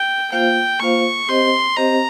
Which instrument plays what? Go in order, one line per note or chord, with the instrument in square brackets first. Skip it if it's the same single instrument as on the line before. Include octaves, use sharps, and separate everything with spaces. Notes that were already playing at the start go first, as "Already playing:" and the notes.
Already playing: [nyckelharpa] G5
[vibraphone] A#3 F4 C5 F5 [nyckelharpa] G5
[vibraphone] A#3 F4 C5 F5 [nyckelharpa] C#6
[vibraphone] C4 G4 C5 D#5 [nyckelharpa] C6
[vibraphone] C4 G4 C5 D#5 [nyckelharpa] A#5